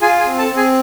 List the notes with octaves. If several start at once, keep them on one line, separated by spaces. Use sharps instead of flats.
F4 G#4 G#5
G#4 G#5
C4
A4 A5
C4
G#4 G#5